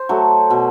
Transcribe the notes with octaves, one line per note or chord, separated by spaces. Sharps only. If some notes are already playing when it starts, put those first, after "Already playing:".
Already playing: C5
F#3 A3
B2